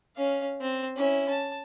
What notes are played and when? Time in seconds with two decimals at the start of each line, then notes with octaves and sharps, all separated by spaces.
0.16 C#4 F5
0.61 C4
0.96 C#4 E4
1.29 A5